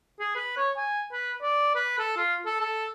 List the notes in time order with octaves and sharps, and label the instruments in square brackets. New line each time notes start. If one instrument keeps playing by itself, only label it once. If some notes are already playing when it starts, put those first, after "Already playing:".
[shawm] G#4
B4
C#5
G#5
B4
D5
B4
A4
F4
A4
A4